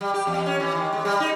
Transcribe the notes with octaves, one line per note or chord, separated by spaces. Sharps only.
G3
G4
E2
C#4
E3
D#3
G#3
G3
D#4